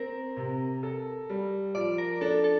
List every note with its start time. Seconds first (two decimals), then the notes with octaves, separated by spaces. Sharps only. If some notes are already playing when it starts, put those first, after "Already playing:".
Already playing: C4 A#4
0.37 C3
0.83 A4
1.29 G3
1.75 F3 D5
1.98 A#4
2.21 D4 A4
2.44 A4